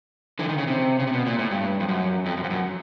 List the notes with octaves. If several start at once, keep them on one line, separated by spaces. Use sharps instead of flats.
D3 E3
D#3
C#3
C3
C#3
C3
B2
A#2
A2
G2
F2
F#2
F2
F#2
F2
F#2